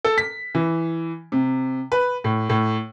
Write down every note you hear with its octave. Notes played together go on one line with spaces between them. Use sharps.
A4
B6
E3
C3
B4
A2
A2